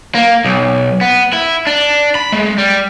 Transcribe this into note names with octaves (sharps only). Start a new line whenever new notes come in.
A#3
B1
B3
E4
D4
B5
G#3
G3